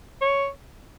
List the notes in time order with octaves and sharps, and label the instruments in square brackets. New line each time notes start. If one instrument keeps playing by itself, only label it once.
[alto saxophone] C#5